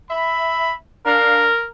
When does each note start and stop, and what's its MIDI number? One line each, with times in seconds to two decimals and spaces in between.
0.10 0.75 76
0.10 0.75 83
1.06 1.47 62
1.06 1.66 70
1.06 1.47 77